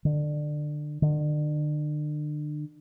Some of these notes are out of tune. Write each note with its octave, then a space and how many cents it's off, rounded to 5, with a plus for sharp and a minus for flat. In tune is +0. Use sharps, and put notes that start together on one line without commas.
D3 +25
D3 +40